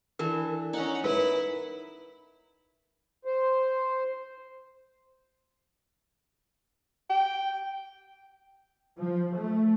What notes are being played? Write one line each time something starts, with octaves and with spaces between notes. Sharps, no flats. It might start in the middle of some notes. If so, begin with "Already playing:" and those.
E3 D4 A4 A#4
C#4 D#4 F#5 A#5
E4 A#4 B4
C5
G5
F3
A3